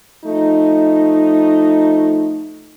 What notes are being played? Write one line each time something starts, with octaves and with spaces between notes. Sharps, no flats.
F3 A3 D#4